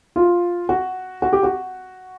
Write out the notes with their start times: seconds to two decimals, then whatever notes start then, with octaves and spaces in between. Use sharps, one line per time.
0.16 F4
0.69 F#4
1.22 F#4
1.33 G4
1.43 F#4